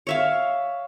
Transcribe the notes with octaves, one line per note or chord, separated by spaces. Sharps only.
C#5 E5 F5